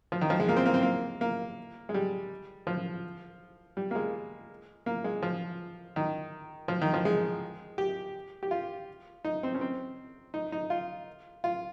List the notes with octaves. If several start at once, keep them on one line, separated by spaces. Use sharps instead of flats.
F3
D#3
F3
G#3
A#3
C4
A#3
C4
A#3
A#3
G#3
G3
F3
G3
A#3
G#3
A#3
G#3
F3
D#3
F3
D#3
F3
G#3
G4
G4
F4
D#4
C4
C#4
C4
D#4
D#4
F4
F4